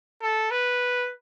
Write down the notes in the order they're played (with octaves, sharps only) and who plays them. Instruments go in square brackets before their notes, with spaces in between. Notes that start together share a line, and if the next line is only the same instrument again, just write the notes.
[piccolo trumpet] A4
B4